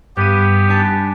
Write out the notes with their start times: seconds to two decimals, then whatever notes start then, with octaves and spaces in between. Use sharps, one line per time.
0.17 G2 B3 G4 D#7
0.69 D4 G#5 A5